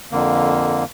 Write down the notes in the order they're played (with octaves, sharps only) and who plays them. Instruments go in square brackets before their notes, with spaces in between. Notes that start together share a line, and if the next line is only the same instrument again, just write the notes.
[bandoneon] F2 D3 A#3